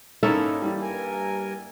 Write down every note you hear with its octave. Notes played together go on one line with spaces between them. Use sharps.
G#1 A#3 C#4 D#4 E4 A4
E3 G3
G2 A#4 G#5